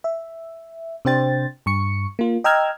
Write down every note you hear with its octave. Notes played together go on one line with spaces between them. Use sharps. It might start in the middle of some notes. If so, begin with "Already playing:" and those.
E5
C3 D4 C5 G5 A6
G2 C#6 C#7
A#3 F4
D#5 G5 A#5 E6 F6 G#6